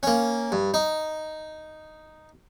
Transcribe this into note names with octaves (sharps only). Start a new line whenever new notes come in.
A#3 C#4
G2
D#4